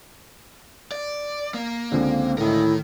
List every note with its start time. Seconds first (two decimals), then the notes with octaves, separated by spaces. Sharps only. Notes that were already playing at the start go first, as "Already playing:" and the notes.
0.92 D5
1.54 A#3
1.92 C#2 D3 C4
2.38 A2 D#3 E4 A#4